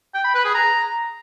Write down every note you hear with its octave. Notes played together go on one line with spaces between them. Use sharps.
G5
B5
B4
G#4
A#5